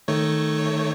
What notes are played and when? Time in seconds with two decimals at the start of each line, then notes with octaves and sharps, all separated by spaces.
0.08 D#3 A3 C#5